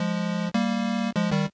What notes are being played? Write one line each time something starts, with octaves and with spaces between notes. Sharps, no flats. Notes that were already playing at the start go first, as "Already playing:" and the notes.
Already playing: F3 G#3
G3 A#3
F3 G#3
D#3 G3